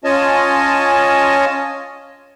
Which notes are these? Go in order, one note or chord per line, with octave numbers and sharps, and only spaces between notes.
C#4 F4 C#5 D#5 G#5 A5